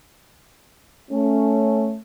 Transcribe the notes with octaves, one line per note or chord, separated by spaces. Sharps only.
A3 C#4